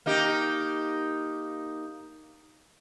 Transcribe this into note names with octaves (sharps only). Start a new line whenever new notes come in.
A#3 D#4 G4